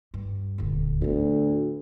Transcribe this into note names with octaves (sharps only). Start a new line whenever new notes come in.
G2
D#1 D2
D2 A2 B3